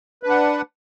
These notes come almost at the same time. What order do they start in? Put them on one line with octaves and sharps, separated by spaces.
B4 D4 F#5